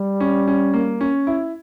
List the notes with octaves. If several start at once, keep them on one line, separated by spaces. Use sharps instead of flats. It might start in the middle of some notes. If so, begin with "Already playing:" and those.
Already playing: G3
C#4
C#4
A#3
C#4
E4